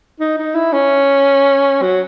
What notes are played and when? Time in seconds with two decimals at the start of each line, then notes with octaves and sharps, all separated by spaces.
0.20 D#4
0.38 D#4
0.55 E4
0.73 C#4
1.82 F#3